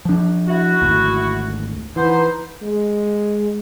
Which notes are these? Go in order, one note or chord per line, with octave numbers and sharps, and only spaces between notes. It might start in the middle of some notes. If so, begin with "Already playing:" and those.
F3 D4
E4 F#4
G#1 D2
E3 B3 D#4 C5
G#3